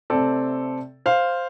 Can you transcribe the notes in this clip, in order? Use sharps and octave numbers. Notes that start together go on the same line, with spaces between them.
C3 A3 C4 A4 D5
C5 F5